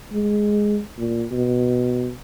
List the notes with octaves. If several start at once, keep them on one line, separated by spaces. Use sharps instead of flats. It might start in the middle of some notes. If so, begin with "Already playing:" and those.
G#3
A#2
B2